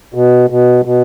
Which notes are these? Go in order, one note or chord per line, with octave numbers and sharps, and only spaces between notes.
B2
B2
B2